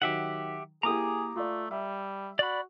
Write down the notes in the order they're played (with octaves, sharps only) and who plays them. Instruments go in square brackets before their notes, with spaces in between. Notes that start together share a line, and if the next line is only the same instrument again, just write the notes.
[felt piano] D#3 F#3 [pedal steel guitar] G4 E5 F#5
[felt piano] A#3 E4 G4 [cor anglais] G#4 [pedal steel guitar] A#5 D6 D#6
[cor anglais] A3 [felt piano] F4 D5
[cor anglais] G3 [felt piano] E5
[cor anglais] F#4 [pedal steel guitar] D5 B5